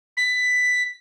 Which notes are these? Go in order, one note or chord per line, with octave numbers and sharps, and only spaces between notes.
B6